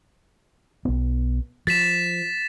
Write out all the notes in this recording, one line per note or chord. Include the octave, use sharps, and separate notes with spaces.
B1 B3
F3 A6 B6 E7